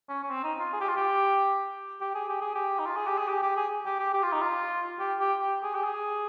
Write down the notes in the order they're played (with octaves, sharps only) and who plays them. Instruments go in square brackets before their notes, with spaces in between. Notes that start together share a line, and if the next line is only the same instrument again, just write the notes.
[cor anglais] C#4
C#4
C4
D#4
F4
G#4
G4
F4
G4
G4
G#4
G4
G#4
G4
D#4
F4
G#4
G4
G#4
G4
G4
G#4
G4
G4
G4
F4
D#4
F4
G4
G4
G4
G#4
G4
G#4